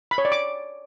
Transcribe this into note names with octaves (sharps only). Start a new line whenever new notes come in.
B5
C#5
D5
D6